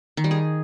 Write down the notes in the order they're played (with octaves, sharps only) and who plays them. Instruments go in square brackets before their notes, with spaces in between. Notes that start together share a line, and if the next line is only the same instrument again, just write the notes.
[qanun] D#3
G3
G#4